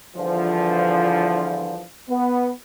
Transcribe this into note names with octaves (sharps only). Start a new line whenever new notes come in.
E2 G2 D3 E3 F3
B3